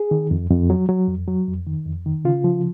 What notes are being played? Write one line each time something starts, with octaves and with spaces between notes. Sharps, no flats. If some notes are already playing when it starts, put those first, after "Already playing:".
Already playing: G#4
D#3
F2
F2
F#3
F#3
F2
F#3
F2
D#3
F2
D#3
C#3 F4
F3